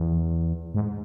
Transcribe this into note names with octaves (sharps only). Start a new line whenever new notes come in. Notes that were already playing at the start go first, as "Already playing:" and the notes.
Already playing: E2
G#2